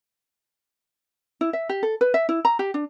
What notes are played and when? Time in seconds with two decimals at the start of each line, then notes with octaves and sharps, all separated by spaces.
1.41 E4
1.53 E5
1.69 G4
1.83 A4
2.01 B4
2.14 E5
2.29 E4
2.45 A#5
2.59 G4
2.74 D4